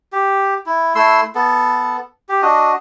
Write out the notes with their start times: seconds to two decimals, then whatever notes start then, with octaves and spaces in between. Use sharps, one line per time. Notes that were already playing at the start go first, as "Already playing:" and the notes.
0.12 G4
0.66 E4
0.95 A3 E4 C6 E6
1.35 B3 A4
2.29 G4
2.42 D4 F#4 D#5